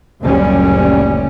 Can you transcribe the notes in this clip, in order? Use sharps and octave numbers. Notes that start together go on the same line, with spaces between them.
F#1 D2 A#2 G3 C#4